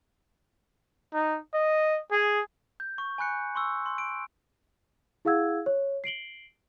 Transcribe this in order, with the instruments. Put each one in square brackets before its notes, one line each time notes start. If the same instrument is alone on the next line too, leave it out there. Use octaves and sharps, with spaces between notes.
[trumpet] D#4
D#5
G#4
[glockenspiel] G6
C#6
G#5 B5 F#6 C#7
C6 C#6 E6
C6
D7
[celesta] E4 G#4 F5 F#5 E6 G#6
C#5
C7 D7 F#7 G7